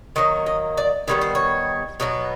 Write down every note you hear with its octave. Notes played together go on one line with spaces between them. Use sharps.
D#3 F#3 A#3 D#5
D#5
D5
D#3 G3 B3 C#5
C5
C#5
B2 F#3 B3